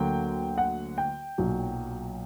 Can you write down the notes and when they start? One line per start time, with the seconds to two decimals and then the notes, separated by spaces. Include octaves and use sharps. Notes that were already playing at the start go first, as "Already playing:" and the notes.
Already playing: D2 D3 F#3 A#3 G5
0.58 F#5
0.98 G5
1.38 B1 A#2 F#3